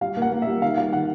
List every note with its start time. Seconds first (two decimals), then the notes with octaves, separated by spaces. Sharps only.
0.01 G3 F5
0.17 A#3
0.22 F#5
0.32 A#3
0.42 G3 E5
0.62 D#3 F5
0.77 G3 F5
0.92 D#3 F#5